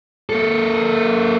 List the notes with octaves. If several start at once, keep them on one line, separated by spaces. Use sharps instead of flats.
A#3 A4